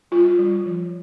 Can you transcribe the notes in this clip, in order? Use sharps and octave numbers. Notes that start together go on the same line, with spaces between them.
G3 F4
G3
F3